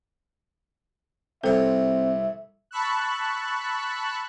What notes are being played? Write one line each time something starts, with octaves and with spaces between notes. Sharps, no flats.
C2 C4 A4 C#5 E5
A5 B5 C#6 E6 F#6